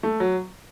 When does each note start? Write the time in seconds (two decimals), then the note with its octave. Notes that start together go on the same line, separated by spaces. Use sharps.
0.03 A3
0.20 F#3